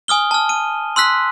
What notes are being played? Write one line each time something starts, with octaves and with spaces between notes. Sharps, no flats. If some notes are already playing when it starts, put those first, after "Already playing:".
G#5 D#6 F6 G7
A5 F6
D#7
C6 E6 F#6 B6